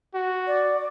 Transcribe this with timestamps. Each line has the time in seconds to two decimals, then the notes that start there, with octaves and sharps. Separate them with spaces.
0.14 F#4
0.47 D5